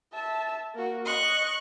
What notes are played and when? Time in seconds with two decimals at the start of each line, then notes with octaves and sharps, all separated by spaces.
0.13 E5 A5
0.75 A#3 F#4
1.05 D#5 C#6 F#6